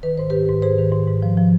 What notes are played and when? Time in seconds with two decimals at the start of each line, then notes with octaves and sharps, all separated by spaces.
0.03 D#3 B4
0.18 G#2 C5
0.30 D#3 G4 B4
0.49 G#2
0.62 G#2 G#4 C5
0.78 D#3
0.92 G#2
1.07 G#2
1.22 F3
1.37 F3